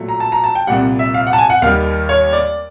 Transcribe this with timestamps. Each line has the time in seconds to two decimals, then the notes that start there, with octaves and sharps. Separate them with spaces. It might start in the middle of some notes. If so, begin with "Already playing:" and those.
Already playing: A#2 F#3 A3
0.09 A#5
0.20 A5
0.32 A#5
0.44 A5
0.55 G5
0.67 C2 A#2 G3 F#5
0.99 E5
1.14 F5
1.27 F#5
1.33 A5
1.38 G#5
1.50 F#5
1.62 D#2 D#3 G3 F5
2.09 C#5
2.33 D5